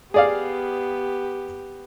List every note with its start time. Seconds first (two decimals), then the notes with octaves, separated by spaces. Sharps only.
0.14 B3 G4 G#4 D5 F5